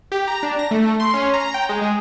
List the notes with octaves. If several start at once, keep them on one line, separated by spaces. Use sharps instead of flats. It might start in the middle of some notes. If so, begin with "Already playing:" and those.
G4
A#5
D4
A#6
A3
C6
C#4
A#5
G5
G#3
G#3